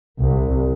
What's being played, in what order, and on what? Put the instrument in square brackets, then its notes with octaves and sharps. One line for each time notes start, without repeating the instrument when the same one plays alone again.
[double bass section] C2